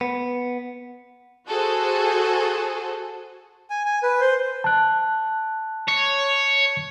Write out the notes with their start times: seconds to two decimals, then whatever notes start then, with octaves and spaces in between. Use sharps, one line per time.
0.01 B3
1.47 F#4 G#4 A4 C5
3.70 G#5
3.86 G#5
4.03 B4
4.21 C5
4.64 A5 F#6
5.88 C#5